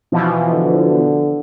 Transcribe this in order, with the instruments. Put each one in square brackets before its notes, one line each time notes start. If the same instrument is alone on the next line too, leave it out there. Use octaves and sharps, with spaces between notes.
[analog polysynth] B2 E3 F3
[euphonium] D3